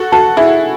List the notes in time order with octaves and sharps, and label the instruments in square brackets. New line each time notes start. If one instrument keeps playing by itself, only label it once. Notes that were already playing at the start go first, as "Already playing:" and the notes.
Already playing: [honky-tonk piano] F#4 A4
[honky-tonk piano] F#4 A4 [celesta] A5
[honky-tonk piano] E4 G#4 [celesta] E5